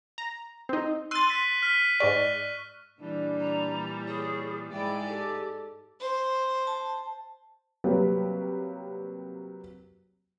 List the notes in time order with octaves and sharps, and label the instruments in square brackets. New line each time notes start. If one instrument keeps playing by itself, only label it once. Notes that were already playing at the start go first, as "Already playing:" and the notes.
[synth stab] A#5
C4 D#4
[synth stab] C6 A6 [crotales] E6 F#6 D#7
[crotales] B6
F6 B6 D#7
[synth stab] G#2 G#3 D5 [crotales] C#6 B6
[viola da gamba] A#2 E3 G3 [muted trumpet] D4
[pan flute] A#5
[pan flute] G#4 [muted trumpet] C#5
[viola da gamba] G#2 G#3 D5 [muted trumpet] E4 [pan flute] G5
[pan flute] G4 [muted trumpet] A4
[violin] C5
[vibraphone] A5
[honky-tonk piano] C3 F#3 G3 A#3 G4 B4